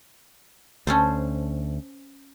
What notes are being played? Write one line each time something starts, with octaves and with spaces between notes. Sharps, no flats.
D2 C#4 A4 C5